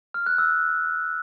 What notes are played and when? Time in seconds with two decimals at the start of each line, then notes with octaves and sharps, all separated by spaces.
0.14 F6
0.26 F#6
0.38 E6